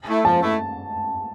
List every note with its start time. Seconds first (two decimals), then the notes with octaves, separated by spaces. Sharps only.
0.08 A3 E4
0.25 F3 A5
0.43 A3 E4